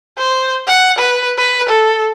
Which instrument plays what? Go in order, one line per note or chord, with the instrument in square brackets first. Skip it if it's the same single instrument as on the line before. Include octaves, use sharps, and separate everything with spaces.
[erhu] C5
F#5
B4
B4
A4